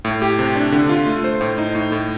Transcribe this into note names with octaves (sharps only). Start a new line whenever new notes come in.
A2
G4
C3
D4
D3
F4
A3
C5
A2
D#4
A2
A2